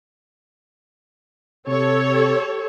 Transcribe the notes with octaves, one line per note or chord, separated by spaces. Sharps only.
C3 G4 A4 C#5